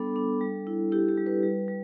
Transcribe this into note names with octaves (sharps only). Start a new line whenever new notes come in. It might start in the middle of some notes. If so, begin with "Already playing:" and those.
Already playing: G3 B3 D4 A4 B5 D6
D4
G3
E4
E4 G4
G4
G3
B4
G3
G3